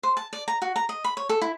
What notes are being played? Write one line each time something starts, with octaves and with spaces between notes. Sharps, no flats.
C5
A5
D5
A#5
F#4
A#5
D#5
B5
C#5
A4
E4